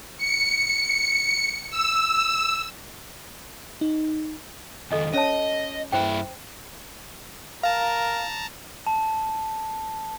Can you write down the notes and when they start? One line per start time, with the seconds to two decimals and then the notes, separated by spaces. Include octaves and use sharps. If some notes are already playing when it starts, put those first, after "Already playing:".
0.18 C#7
1.70 E6
3.81 D#4
4.91 C#2 D#3 A4 D#5 G#5
5.13 C#4 C#5 D#5 A5
5.92 G2 E4 C5 G5
7.63 A#4 F5 A5 A#5
8.87 A5